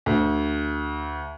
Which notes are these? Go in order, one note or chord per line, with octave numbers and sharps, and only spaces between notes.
D2